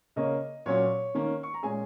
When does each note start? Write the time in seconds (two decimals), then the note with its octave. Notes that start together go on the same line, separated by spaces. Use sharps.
0.16 C#3 A#3 C#4 D#5
0.66 A#2 F#3 C#4 C#5
1.15 D#3 A#3 C#4
1.43 C#6
1.54 A#5
1.63 A#2 G#3 C#4 G#4 G#5